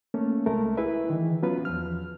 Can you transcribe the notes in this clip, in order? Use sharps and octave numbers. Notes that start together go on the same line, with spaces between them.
A3 A#3 C#4
C2 G#3 A3 A#4
E4 G#4 B4 E5
D#3 E3
F#3 B3 C#4 F4 B4
E2 F3 F6